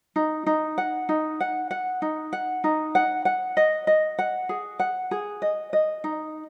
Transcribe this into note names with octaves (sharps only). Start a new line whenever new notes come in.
D#4
D#4
F#5
D#4
F#5
F#5
D#4
F#5
D#4
F#5
F#5
D#5
D#5
F#5
G#4
F#5
G#4
D#5
D#5
D#4